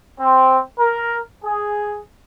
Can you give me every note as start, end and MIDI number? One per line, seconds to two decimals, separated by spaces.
0.19 0.58 60
0.78 1.19 70
1.43 1.97 68